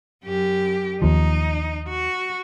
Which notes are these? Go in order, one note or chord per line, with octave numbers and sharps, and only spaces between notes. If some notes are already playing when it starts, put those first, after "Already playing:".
F#2 G4
D#2 F3 D#4
F#4